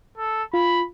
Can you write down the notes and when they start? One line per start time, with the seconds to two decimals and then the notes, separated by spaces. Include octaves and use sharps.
0.17 A4
0.54 F4 B5